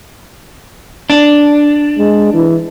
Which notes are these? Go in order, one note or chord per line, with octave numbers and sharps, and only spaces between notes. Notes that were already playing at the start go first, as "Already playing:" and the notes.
D4
G#3
E3